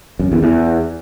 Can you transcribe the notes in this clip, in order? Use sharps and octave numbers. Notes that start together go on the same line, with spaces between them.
F#2
E2
E2